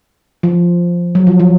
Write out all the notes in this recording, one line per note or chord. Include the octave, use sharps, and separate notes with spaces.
F3
F#3
F3
F3